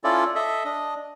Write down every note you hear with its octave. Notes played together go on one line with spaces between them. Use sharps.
C#4 E4 F4 A4 D5
A4 D#5 E5
D4 D#5